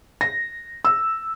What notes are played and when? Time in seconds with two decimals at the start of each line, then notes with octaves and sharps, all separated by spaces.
0.21 A#6
0.85 E6